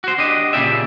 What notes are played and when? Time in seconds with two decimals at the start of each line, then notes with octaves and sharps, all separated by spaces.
0.04 F#4 C5
0.18 D4 G4 D#5
0.53 A#2 C#3 B3 G4 D5 E5